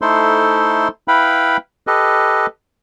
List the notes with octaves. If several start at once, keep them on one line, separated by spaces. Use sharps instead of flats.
A3 D#4 E4 A4 C5 C6
E4 B4 F5 G5 B5
G4 A4 B4 D#5